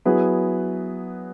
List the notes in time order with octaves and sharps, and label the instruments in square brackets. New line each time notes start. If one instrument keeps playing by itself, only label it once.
[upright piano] F#3 B3 E4 G#4 B4